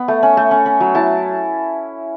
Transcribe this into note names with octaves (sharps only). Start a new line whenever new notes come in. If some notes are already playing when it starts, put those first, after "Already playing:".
Already playing: B3
A3
C#4
A3
C#4
C#4
F#3
E4 A5